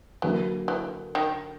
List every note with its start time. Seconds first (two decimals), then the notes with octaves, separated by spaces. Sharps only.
0.22 D3 E3 F#3 A#3
0.68 E3
1.15 D#3